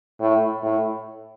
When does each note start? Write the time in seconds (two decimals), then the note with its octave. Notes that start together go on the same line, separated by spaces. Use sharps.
0.20 A2
0.63 A2